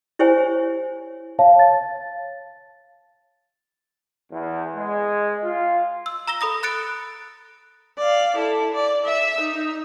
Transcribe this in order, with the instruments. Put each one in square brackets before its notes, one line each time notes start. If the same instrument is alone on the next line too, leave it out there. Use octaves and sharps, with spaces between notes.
[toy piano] E4 G4 C5 C#5 G#5
[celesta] C#5 F5 A5
A6
[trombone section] E2
G#3
F4
[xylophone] E6
A#5 E6 A#6 G7
A4 B5 D#6 A#6
B5 F#6 A6 C#7 D7
[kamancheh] D5 F5
E4 A4
D5
E5 E6
D#4